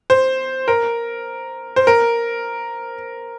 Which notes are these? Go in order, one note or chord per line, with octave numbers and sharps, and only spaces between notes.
C5
A#4
C5
A#4